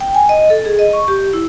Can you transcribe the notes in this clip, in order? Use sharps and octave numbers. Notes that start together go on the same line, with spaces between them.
G5
G#5
D#5
A4
G#4
D#5
C#6
G4
E4